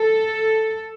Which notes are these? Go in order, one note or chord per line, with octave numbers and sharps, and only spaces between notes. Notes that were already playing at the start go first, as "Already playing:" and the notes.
Already playing: A4